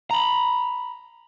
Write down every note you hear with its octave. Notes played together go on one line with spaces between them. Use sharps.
A#5 B5